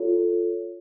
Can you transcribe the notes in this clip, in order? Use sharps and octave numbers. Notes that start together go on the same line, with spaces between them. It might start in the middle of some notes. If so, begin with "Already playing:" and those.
Already playing: F4 A4 C#5